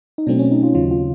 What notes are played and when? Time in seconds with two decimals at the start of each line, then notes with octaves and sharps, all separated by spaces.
0.18 D#4
0.27 B2 F#3 A3 C4 D4
0.39 C#4
0.51 D#4
0.63 F4
0.74 D#2 C#3 F#3 F4
0.91 F4